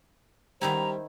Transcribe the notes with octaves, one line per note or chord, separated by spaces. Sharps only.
D#3 G3 D#4 E4 C5 A#5